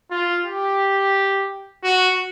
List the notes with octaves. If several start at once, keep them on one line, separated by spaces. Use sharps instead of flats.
F4
G4
F#4